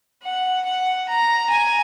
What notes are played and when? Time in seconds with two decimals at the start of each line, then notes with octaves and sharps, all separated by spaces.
0.23 F#5
0.66 F#5
1.08 A#5
1.50 G#5